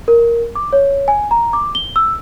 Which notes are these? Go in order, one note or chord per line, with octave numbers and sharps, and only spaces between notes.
A#4
D6
C#5
G#5
A#5
D6
G7
E6